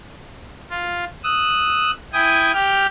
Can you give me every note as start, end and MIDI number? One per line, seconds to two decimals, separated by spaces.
0.70 1.05 65
1.24 1.91 87
1.24 1.91 88
1.24 1.91 90
2.13 2.52 64
2.13 2.52 79
2.13 2.52 80
2.13 2.52 87
2.53 2.87 67
2.53 2.87 79
2.53 2.87 89